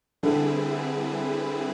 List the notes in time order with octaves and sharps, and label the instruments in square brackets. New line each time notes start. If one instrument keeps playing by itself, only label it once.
[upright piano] D3 [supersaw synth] G3 C4 E4 G#4 B4